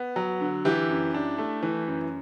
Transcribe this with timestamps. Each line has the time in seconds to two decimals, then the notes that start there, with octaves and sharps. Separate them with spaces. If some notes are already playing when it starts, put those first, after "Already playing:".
Already playing: B3
0.16 F#3
0.41 D3
0.65 E3 E4 G4
0.89 F#2
1.14 D4
1.38 A3
1.63 E3
1.88 F#2